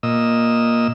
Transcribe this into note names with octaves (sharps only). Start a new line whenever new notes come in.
A#2 D#5 E6